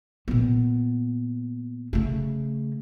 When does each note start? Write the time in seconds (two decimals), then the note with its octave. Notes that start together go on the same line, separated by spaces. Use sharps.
0.28 A#2 B3
1.93 C#3 A3